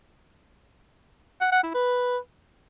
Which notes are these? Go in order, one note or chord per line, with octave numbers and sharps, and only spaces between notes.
F#5
F#5
E4
B4